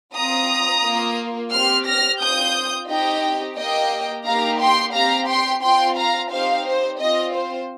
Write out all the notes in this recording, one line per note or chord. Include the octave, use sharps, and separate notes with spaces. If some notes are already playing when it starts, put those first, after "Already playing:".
C4 F4 A#5 D#6
A#3 F4
C4 G4 C6 F6
F6 A#6
C4 F4 D#6 G6
C4 D#4 G4 D#5 G5
A#3 G4 D#5 G5
A#3 D#4 G4 F5 A#5
G5 C6
C4 G4 F5 A#5
G5 C6
C4 F4 G5 C6
F5 A#5
C4 D#4 G4 C5 F5
C5
C4 F4 D#5
C5